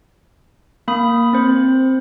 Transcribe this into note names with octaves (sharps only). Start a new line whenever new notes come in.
A#3 B5 D#6
C4 C5